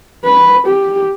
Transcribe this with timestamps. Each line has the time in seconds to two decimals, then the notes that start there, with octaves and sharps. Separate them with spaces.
0.24 B4
0.66 G4